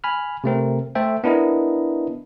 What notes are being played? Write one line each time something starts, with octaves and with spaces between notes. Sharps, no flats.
G#5 B5 F6
C3 A3 C4 A#4
A3 A4 C5 E5 G5
B3 D4 E4 A#4 D#5